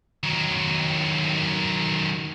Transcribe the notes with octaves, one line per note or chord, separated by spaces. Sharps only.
D#3 F#3